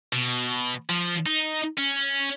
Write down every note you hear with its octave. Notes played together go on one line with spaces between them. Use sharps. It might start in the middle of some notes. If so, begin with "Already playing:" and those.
B2
F3
D#4
C#4